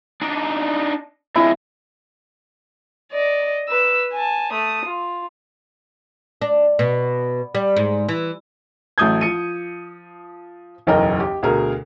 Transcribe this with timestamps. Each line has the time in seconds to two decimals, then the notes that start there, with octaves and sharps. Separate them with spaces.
0.21 D4 D#4
1.36 F2 G#3 E4
3.12 D5 D#5
3.69 B4 E6
4.13 G#5 A5
4.52 A3 D#6
4.85 F4
6.42 D4
6.79 B2
7.55 G3
7.76 G#2
8.09 E3
8.98 A1 F#3 A3 D#6 G6 G#6
9.21 F3 C#7 D#7
10.87 F#1 B1 E2 A#4 D#5 G5
11.20 G4
11.43 D2 B2 G#4 A#4